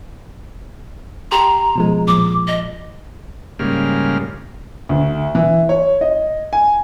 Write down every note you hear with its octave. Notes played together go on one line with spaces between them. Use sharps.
G4 A#5 C6
B2 F3 G#3
A#2 F3 D6
D#5
G#2 C#3 G3 A#3 F6
D2
E3
C#5
D#5
G#5